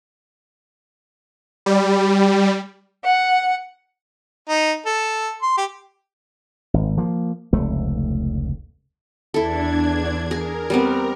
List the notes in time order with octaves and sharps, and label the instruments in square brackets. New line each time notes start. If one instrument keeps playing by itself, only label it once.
[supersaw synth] G3
[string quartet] F#5
[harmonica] D#4
A4
C6
G4
[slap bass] G#1
F3 A#3
F1 C#2 A3
[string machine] E2 D4 G#6 [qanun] E4 A4
[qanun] G#4 [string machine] A#4
[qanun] G3 B3 C4